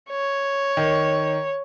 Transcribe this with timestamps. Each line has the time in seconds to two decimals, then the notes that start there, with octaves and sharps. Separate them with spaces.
0.10 C#5
0.77 D#3